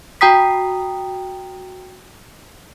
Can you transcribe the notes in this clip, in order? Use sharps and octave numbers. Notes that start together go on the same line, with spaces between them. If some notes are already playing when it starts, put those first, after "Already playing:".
F#4 G5 A#5 D#6 B6